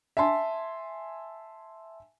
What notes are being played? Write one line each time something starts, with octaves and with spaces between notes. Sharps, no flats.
E5 G#5 A5 C6